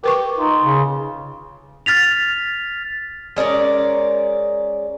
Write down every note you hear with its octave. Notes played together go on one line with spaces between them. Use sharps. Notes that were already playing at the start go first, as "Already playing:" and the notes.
G4 A#4 B4 C#6
D#4 F4
C#3
F6 A6 B6 F7
G#3 C#4 A#4 D5